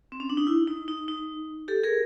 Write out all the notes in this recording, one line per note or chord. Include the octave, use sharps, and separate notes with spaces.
C4
C#4
D4
D#4
E4
D#4
D#4
D#4
G4 A4
G#4 A#4